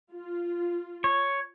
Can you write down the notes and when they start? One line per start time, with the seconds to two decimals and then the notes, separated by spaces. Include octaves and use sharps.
0.12 F4
1.04 C#5